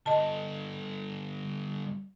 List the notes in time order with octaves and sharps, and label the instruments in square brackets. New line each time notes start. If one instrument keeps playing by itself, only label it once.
[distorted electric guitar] G2 D3 [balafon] D#5 A5